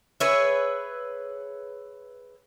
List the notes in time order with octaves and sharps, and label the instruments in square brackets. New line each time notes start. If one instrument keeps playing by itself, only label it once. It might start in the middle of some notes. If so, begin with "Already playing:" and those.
[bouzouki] G#4 B4 C#5 E5